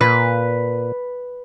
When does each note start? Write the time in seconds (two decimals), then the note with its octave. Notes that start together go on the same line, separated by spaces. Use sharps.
0.01 A#2 B4